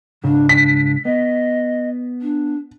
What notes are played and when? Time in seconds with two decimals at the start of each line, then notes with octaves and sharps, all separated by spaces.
0.24 C#2 G#2 C#3 D4
0.49 D4 B6
1.05 B3 D#5
2.22 D4